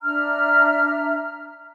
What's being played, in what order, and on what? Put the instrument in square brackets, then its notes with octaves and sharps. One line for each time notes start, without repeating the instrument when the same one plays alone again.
[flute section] D4 E5 A#5 F6